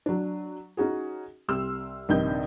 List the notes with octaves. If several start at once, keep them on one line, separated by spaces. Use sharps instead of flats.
F#3 D4
C#4 D#4 F#4 G#4
C2 G4 C6 E6 F6
A#1 G2 C3 D#3 D#5 G6